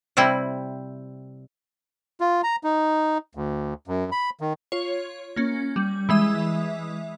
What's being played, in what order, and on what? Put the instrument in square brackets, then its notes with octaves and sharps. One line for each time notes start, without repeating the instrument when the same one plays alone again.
[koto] C3 G3 C4 E4
[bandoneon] F4
A#5
D#4
D2
F#2
B5
D#3
[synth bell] F4 C#5
A#3 C#4
G3
E3 G#3 E5 D#6